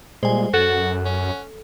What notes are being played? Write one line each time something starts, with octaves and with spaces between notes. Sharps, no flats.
A#2 G3 G#3 C5 G#5
F#2 F#4 A4 F#5 F#6
C#4